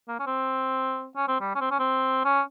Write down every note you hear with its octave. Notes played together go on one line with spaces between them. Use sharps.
A#3
C#4
C4
C#4
C4
G3
C#4
C4
C#4
C4
C#4